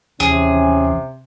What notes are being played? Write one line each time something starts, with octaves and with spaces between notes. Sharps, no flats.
D#2 C3 E3 C#4 G#4